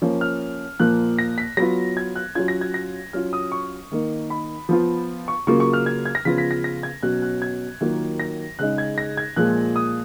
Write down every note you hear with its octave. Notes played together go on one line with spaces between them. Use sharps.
F3 A#3 C#4
F6
A#2 F3 A#3 F#6
A#6
B6
F#3 B3 F4 A#6
G#6
F#6
F#3 C#4 F4 G#6
A#6
G#6
A#6
F#3 C#4 F4 F6
D#6
C#6
D#3 A#3 D#4
B5
F3 B3 F4
C#6
C#3 F#3 A#3 F4 C#6
C#6
F6
G#6
G#6
A#6
C#3 F3 B3 F4 B6
B6
A#6
A#6
G#6
B2 F#3 C#4 F#6
F#6
G#6
D#3 F#3 A#3 F4
A#6
C#3 G#3 D#4 F#6
G#6
A#6
G#6
A#2 F3 G#3 F#6
D#6